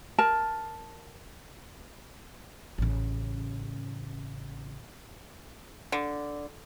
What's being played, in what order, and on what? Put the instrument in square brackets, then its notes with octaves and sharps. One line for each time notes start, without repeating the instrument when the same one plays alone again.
[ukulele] A#4 A5
[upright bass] A1 C#3
[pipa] D3